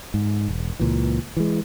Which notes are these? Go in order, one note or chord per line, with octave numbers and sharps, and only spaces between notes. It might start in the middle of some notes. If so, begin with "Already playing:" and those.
G#2
E1
C#2 A#2 E3
E3 G#3